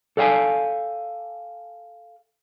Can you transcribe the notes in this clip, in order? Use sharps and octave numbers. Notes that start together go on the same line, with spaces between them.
A4 D5 F5 G5 G#5